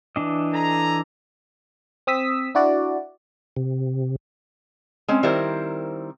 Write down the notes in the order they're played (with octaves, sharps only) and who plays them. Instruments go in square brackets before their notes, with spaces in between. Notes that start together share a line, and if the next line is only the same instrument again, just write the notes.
[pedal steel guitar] E3 D4 D#5
[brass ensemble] A4 G#5 A#5
[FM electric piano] C4 D#6 E6 B6
D4 E4 F#4 D5
[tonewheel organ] C3
[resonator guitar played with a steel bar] G#3 C4 C#4
D#3 G3 C4 E4 A#4 C5